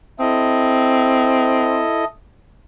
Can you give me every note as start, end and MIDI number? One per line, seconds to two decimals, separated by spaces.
0.20 1.85 60
0.20 2.04 64
0.20 2.04 69
0.20 2.04 75